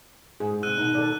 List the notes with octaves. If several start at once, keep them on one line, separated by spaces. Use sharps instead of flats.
G#2 G#4
G#2 C3 E6 F#6 D#7
B2 D#3 D#4
A4 D5